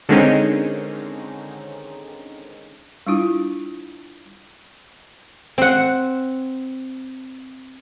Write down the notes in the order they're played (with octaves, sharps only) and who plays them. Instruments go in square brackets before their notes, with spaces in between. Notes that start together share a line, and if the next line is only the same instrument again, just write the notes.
[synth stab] D3 D#3 G#3 C4 C#4 D#4
[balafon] G3 D4 E4 F4
[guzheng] C4 F#5